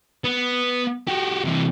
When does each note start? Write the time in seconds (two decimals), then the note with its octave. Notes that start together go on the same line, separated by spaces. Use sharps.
0.24 B3
1.07 F#4 G4
1.44 C3 E3